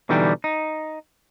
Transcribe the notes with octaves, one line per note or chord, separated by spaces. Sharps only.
B2 D3 E3 G3 D#4 G5
D#4